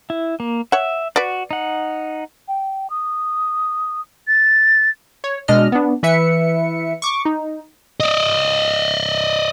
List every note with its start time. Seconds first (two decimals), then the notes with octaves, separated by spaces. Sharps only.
0.10 E4
0.40 A#3
0.72 C#5 E5 F#5
1.16 F#4 B4 D5
1.51 D#4 F#5
2.48 G5
2.90 D#6
4.28 A6
5.24 C#5
5.48 B2 G#3 D4 D#5 F6
5.72 B3 D4
6.03 E3 B4 E5 C#7
7.02 C#6 D6
7.25 D#4
8.00 D5 D#5